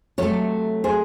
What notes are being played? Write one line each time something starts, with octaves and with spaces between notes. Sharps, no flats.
C3 F#3 A3 A4 C#5
G#4 C5